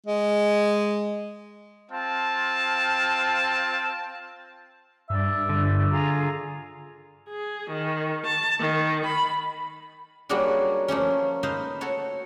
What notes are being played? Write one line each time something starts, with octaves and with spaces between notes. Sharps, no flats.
G#3
C4 F4 F5 A5
G2 D5 E5
D3
F4 G#4 A#5
G#4
D#3
A5
D#3
B5
F#3 G3 A#3 D4 F#4 G#4
F3 A3 A#3 C#4
D#4 B4 C5 D#5 F5
F#4 A4 C#5